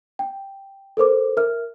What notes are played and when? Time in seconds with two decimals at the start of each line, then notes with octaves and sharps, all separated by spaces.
0.19 G5
0.97 A4 A#4 C5 D6
1.37 A#4 E5 F6